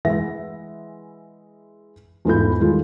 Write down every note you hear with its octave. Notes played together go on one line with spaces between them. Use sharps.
E3 G#3 B4 E5 F#5 A#6
E2 G#2 F4 A4 B5 G6
D#3 G3 G#3 F4 A4